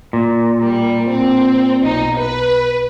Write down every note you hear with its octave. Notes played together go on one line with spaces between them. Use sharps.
A#2
G3
C4
B1 D#4
B4